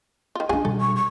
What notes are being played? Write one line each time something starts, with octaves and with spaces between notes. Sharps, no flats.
D#3 F4
C#4 D4 F4 G#4 G#5
B2 G3 A4
C#6
C#6